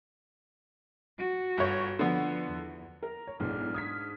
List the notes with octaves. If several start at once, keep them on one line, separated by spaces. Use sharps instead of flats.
F#4
G1 C#5
D3 F3 B3
E2
A#4 A#5
C#5
B1 G#2 E3 D4 F6
D#6 G#6 B6
F6